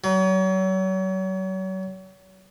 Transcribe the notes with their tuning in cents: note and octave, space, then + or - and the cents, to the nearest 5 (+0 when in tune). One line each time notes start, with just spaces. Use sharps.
F#3 +35